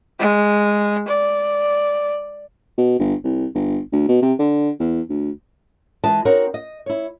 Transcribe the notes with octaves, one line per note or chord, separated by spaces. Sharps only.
G#3
D5
B2
G1
C2
G1
D2
B2
C3
D3
E2
D2
E3 G#3 B4 D#5 A5
C4 D#4 F#4 A#4 C#5
D#5
E4 C#5